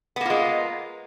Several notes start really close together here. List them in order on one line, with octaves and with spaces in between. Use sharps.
B3 A#3 F4 G#3